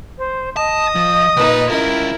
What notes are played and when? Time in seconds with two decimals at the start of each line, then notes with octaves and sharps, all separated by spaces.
0.18 C5
0.57 D#5 A5 D#6
0.96 F3
1.36 C#2 A#2 D#4 B4
1.70 C#4 E4 F4 A#4